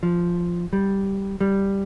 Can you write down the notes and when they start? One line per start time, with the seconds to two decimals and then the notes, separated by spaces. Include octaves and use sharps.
0.03 F3
0.73 G3
1.41 G3